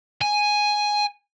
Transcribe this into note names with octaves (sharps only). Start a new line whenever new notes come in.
G#5